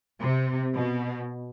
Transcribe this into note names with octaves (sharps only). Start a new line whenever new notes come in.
C3
B2